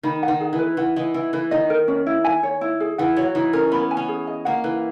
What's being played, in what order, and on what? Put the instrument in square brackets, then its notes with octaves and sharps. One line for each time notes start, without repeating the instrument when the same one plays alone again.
[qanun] D#3 [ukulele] B5
[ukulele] F#5
[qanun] D#3
[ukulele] G#4
[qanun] E3
[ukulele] B4
[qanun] E3 [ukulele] F#5
[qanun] E3 [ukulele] D#5
[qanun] E3 [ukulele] E4
[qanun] E3 [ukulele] B4
[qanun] D#3 [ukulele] D#5
[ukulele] A#4
C#4
E4
G#5
C#5
E4
G#4
[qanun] E3 [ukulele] F#5
[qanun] F#3 [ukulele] C#5
[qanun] E3 [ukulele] D#4
[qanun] C#4 [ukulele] A#4
[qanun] B3 [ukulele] B5
[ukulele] G#5
[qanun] C#4
[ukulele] G#4
D#5
[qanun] A#3 [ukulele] F#5
[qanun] E3 [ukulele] B4